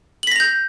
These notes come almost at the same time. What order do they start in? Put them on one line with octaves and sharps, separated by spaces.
F#7 B6 A#6 F7 G6